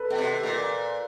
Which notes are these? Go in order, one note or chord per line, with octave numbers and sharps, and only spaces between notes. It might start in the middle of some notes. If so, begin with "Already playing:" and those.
Already playing: A4 B4
B2
C3
A#2